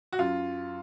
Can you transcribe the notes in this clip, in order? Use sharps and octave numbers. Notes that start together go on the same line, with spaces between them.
F#4
F#2 F4